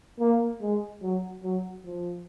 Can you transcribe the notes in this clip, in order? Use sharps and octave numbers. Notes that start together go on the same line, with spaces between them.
A#3
G#3
F#3
F#3
F3